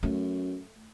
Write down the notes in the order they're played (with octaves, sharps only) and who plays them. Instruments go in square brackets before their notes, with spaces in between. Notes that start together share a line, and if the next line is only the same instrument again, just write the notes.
[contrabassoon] F#2 [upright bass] A3